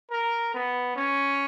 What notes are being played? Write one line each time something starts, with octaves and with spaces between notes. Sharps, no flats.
A#4
B3
C#4